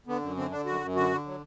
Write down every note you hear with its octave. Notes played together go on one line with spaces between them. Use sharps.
D3 B3
F#2
D3 C4
D3 D4
F#2 F#4
F#2
D3 F#4
D3
F#3